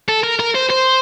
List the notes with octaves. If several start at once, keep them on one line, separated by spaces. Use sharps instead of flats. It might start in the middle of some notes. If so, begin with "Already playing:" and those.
A4
A#4
A#4
C5
C5